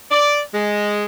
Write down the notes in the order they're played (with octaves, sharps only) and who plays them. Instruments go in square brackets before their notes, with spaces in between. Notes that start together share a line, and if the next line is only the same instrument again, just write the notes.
[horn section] D5
G#3